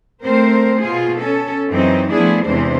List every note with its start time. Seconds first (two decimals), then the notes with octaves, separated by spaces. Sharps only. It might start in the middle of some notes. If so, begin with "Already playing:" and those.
0.23 A3 C4 A#4 C5
0.82 B2 F4 G#4
1.19 C#4 A4
1.69 F#2 E3 C4 D#4
2.12 F3 A3 B3 D4 E4 G#4
2.46 E2 C3 E3 G#3 D4 C5